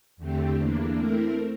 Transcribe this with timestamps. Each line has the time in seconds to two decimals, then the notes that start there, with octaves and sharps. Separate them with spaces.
0.17 E2 D3 A3 C4 G4
0.57 E2 E3 A#3 D4
0.96 A3 C4 E4 A#4